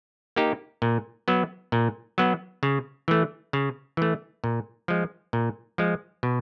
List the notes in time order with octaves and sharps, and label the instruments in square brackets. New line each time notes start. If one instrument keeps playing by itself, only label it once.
[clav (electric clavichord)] A#3 D#4 G4
A#2
F#3 B3
A#2
F#3 B3
C#3
E3 A3
C#3
E3 A3
A#2
F3 G#3
A#2
F3 G#3
B2